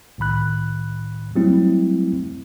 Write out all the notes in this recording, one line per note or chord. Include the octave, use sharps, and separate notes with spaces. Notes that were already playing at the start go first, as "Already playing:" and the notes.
C2 A2 D#3 B5 F#6
F#3 G3 A3 C4 E4